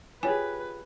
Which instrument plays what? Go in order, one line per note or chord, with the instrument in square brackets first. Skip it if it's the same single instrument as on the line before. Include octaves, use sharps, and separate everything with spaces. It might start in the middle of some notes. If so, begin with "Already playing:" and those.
[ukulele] F4 G4 G#4 [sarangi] B4 [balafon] C#5 G#5